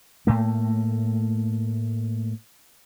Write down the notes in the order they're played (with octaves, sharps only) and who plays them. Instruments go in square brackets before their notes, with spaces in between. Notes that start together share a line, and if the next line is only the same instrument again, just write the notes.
[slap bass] A2 A3 A#3